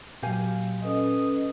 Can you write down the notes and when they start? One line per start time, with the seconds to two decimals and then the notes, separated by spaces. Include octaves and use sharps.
0.23 A#2 F#3 G4 F5 G#5
0.83 C#4 A4 B4 D#5